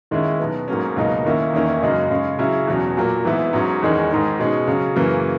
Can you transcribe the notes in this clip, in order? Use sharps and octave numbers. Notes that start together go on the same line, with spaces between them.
D#2 D#3 G#3 C#4 E4
B2 F#3 B3
G#2 F#3 A#3 C#4
C#2 B2 F#3 A#3 D#4
D#2 D#3 A#3 C#4 E4
E2 D#3 A#3 C#4 E4
F#2 C#3 G#3 D#4
C#3 G#3 C#4
C#3 F#3 C#4 E4
E2 B2 F#3 C#4
A#2 F#3 A#3
G#2 E3 B3 E4
G#2 F#3 C#4
E2 D#3 G#3 C#4
G#2 D#3 G#3
B2 G#3 C#4
C#3 F#3 C#4
F#2 C#3 E3 A#3 C#4